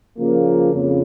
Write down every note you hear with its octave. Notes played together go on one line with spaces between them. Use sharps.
C#3 F3 A#3
F2 C#3